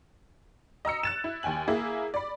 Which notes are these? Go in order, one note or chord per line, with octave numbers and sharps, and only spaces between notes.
D#5 A#5 E6 C#7
F#6 A6 E7
E4
D#2 G5 G#5 F#7
A#3 E4 G#4
D5 B5